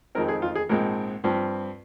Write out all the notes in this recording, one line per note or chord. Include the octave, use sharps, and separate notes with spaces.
F2 D#3 G#3 C4 A#4
G#4
F4
G#4
A#1 G#2 F3 G#3 C4 A#4
G2 F3 C4